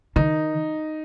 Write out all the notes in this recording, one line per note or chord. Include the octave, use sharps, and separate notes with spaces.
D#3 D#4